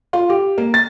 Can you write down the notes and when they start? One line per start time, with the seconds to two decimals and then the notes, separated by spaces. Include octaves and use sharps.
0.13 F4
0.30 G4
0.58 A#3
0.74 A6